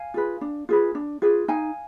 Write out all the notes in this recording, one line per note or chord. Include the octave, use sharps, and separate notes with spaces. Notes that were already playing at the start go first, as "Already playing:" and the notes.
Already playing: F5 G#5
F4 G#4 B4
D4
F4 G#4 B4
D4
F4 G#4 B4
D#4 F5 G#5